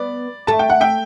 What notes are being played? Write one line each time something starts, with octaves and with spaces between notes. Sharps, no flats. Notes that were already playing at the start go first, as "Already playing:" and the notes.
Already playing: B3 D5
A3 A5
G5
F#5
E5 G5